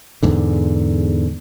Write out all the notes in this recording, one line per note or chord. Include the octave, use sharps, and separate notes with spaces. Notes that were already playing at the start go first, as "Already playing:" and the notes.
E2 G#2 D3